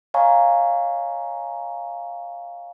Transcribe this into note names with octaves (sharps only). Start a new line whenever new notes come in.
C#5 D#5 F5 G#5 A#5 C#6